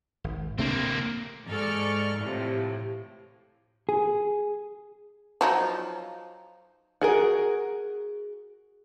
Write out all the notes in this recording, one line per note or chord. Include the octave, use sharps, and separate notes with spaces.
G#1
C3 A3 A#3 C4 D4
G#2 A4 D5 C#6 F6
A2 C3 E3 F3
G#4
F3 F#3 D#4
F#4 G#4 A#4